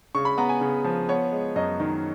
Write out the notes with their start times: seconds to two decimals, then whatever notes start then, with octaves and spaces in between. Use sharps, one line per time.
0.15 C#3 C#6
0.25 B5
0.38 B3 A#5
0.49 G#5
0.61 C#3
0.84 F3
1.09 B3 C#5
1.32 G#3
1.56 F#2 D#5
1.80 D#3